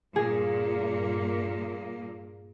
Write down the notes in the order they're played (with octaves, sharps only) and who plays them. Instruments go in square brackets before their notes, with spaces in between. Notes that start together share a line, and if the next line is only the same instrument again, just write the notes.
[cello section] G2 A#2 A#3 [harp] G#4